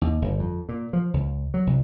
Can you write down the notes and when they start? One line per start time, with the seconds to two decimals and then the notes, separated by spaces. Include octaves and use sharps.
0.01 D#2
0.22 G1
0.39 F2
0.69 A#2
0.93 F3
1.14 C#2
1.54 F#3
1.67 C2